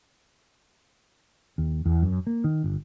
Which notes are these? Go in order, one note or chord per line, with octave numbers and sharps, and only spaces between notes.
D#2
E2
F#2
A#3
D#3
G1